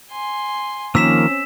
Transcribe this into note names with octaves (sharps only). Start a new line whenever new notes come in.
G#5 C6
D#3 F3 A#3 C4 C#4 E6 B6 E7